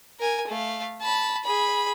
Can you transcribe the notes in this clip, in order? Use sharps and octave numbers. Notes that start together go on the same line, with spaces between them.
A#4 G#5
A3 F5
A5 B5
G#4 B5